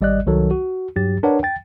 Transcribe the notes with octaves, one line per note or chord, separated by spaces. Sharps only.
G#1 G3 D5 D#5 F#6
C2 D#3 F#3 A4
F#4
G2 F#3 G4 A6
D4 A#4 B4 C#5 F#5
G5 A6